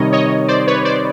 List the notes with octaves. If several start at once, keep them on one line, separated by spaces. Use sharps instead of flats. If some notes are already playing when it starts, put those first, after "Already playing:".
Already playing: C3 D#3 G3 C#5 D#5
C#5 D#5
C5 D5
B4 C#5
C5 D5